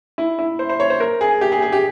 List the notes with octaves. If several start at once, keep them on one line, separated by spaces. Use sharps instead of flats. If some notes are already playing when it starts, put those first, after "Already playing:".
E4
E4
C5
C5
C#5
C5
A#4
G#4
G4
G#4
G#4
G4